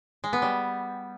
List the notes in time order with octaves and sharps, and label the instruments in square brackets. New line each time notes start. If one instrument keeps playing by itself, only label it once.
[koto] G#3
B3
G3